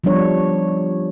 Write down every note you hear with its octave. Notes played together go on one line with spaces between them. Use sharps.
F3 G3 B3 D4 C#5